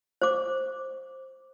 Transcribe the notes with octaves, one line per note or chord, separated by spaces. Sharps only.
C5 D6